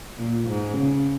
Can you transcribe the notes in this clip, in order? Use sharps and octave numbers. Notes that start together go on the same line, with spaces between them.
A#2
G#2
C#3